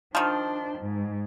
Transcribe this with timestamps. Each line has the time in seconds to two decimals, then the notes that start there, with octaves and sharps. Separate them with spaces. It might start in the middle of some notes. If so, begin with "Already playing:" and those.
0.15 D#3 F3 D4 C5
0.79 G#2